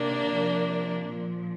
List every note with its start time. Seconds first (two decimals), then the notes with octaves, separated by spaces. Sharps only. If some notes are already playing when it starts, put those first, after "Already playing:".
Already playing: C3 D#3 A#3 D4
0.29 C3 F3
1.06 A#2 F3